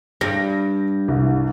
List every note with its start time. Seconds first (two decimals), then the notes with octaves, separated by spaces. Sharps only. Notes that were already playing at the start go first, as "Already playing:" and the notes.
0.21 G2 A#6
1.08 C2